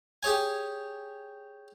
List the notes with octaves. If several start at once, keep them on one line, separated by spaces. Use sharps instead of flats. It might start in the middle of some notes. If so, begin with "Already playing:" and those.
G4 G#4 C#5 G#5